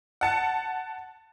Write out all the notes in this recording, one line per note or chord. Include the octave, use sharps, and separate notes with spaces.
F#5 A5 C#7